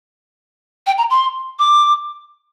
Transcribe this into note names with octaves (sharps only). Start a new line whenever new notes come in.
G5
A#5
C6
D6